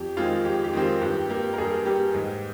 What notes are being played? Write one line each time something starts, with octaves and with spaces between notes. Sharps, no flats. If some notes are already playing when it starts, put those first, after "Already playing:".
Already playing: F2 G4
D#3 G#3 C4 F4
F2 G4
G4
D#3 G#3 C4
F4
G2 G4
G3 A#3 G4
A#4
G2 G#4
G3 A#3 G4
G#2